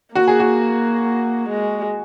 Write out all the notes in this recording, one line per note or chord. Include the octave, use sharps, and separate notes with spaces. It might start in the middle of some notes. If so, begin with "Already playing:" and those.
A#3 F#4
G#4
F#4
G#3